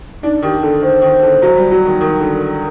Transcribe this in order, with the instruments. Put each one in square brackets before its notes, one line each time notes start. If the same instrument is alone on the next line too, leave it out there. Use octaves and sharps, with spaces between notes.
[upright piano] D4 [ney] D#4
[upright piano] D#3 [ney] G4
[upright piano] D3 [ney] A4
[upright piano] D#3 [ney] C5
[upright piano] D#3
D3
F#3
G3
F#3
D#3
[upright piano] D#3 [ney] A#4
[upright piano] D3